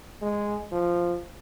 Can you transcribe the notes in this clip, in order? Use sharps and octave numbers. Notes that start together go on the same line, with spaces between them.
G#3
F3